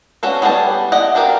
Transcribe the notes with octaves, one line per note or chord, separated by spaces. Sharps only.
C#4 D4 F#4 A4 B4
G3 B3 G4 G#4 A5
E4 D5 D#5 F#5
D4 F#4 G4 A#4 F5